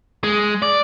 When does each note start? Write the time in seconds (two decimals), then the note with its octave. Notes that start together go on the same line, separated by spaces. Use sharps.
0.24 G#3
0.62 D5